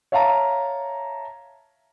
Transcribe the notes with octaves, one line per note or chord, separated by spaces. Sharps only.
C#5 E5 F5 A5 A#5